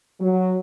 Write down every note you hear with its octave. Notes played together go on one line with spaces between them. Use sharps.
F#3